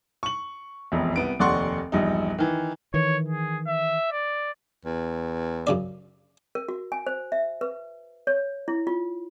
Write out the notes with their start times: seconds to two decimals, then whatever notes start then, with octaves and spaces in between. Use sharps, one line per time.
0.23 C#6 F#7
0.92 E1 A#1 F2
1.16 C2 B3 D7
1.39 F1 D#2 D5 F#5 C6 C#6
1.92 E1 A#1 G2 D#4
2.38 D#3 E3
2.94 D#3 E3 C#5
3.29 G#4
3.67 E5
4.12 D5
4.85 E2
5.67 F#2 C#3 D5
6.55 A#4
6.69 F#4
6.92 G#5
7.07 C5
7.32 E5
7.61 B4
8.27 C#5
8.68 E4
8.87 F4